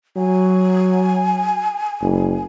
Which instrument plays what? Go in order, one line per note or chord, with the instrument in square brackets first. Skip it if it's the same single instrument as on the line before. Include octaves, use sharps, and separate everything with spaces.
[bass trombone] F#3 [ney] G#5
[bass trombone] F#1